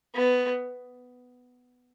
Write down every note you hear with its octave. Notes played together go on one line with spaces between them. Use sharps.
B3